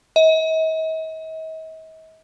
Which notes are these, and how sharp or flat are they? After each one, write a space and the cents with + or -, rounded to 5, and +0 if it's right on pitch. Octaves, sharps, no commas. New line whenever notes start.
D#5 +45